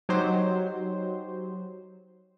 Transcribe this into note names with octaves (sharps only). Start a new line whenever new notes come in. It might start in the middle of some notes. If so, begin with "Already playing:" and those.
F#3 D#4 G4 C5